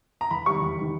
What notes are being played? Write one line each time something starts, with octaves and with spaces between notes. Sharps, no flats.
A#5
E2 B5
D#3 G3 C#6
E2
D#3 G3